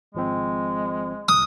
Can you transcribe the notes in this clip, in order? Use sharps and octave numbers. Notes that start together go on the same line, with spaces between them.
G#1 F3 G#3 C4
C2 D#6 F6 F#6